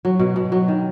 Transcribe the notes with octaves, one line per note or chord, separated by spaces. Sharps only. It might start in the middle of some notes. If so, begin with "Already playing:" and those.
F#3
B2
B2
F#3
D#3